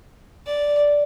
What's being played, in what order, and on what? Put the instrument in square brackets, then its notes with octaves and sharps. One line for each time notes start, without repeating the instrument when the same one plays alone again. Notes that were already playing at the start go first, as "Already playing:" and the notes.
[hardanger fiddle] D5